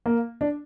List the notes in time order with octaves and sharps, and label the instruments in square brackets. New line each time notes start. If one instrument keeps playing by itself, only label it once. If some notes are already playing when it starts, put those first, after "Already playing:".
[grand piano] A#3
D4